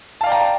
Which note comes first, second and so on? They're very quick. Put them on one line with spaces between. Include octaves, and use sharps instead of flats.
A5 F5 D5 G5 A#5